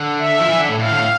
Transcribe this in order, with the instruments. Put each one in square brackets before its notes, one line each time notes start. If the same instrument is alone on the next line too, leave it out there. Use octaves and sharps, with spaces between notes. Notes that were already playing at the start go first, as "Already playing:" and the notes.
Already playing: [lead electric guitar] D3
[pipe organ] E5
[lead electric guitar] F3
E3
D3
A2
[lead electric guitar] A2 [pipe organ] F5
[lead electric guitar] D3
A2